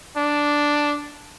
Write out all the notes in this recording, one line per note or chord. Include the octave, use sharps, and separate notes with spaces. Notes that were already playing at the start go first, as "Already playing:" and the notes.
D4